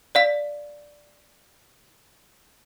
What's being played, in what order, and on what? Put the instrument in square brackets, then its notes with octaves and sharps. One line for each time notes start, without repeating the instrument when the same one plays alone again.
[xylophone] D5 F5 B6